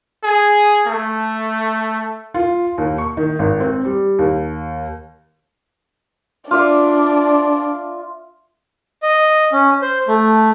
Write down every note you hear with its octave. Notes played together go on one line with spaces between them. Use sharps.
G#4
A3
F4
D#2
C#6
D#3
G#1
C4
G3
D#2
D4 F4 D5 E5
D#5
C#4
C5
A3